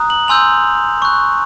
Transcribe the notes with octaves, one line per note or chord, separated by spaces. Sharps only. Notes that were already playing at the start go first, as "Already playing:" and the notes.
Already playing: A#5 D#6 F#6
F#7
G#5 C6 E6 G6 F7
C#6 F#6